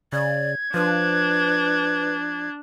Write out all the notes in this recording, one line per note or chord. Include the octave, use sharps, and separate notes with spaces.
C#3 D5 G#6
F3 D4 B4